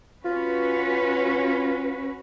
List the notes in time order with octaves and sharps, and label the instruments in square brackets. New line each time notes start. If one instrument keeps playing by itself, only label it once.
[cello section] C#4 F#4 B4 [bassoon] F4